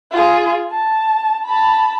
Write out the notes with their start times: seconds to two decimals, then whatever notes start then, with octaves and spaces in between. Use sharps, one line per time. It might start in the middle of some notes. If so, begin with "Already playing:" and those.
0.11 F4 G#4
0.71 A5
1.45 A5 B5